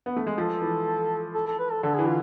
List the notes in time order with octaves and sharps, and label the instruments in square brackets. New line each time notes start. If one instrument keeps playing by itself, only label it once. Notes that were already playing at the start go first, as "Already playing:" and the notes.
[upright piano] B3
A3
G#3
[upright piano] F3 [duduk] A4
[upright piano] E3
[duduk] A4
A4
B4
A4
[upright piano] D3 [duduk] A4
[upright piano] E3 [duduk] G#4
[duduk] F4